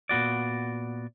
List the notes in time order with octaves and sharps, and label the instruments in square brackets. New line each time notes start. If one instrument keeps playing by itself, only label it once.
[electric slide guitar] A#2 B3 F#4 D5